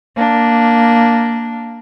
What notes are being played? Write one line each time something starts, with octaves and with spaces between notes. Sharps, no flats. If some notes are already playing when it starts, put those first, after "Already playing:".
A#3 D4